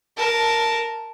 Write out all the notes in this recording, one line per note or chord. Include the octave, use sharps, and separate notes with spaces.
A#4 A5